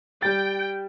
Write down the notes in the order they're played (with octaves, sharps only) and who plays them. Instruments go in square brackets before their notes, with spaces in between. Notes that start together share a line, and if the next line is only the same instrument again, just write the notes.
[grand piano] G3 A6 [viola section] G5